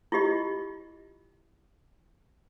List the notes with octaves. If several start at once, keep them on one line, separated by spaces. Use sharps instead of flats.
E4 F4 G4 D#5